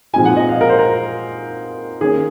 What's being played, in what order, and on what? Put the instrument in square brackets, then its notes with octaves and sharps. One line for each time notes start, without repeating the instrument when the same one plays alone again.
[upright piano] A#2 F3 G#3 C4 D#4 G#5
F#5
D#5
F5
A#4
C5
A#4
D#3 A#3 C#4 G#4